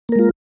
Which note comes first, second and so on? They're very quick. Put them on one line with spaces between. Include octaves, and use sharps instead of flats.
A#3 A#4 G#3 F4